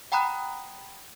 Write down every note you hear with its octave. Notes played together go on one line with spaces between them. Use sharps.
F#5 G5 A#5 B5 D#6 F#6